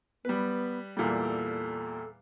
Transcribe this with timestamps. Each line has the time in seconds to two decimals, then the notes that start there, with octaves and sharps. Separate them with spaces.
0.25 G3 B3 B4
0.97 E2 A#2 G3 A4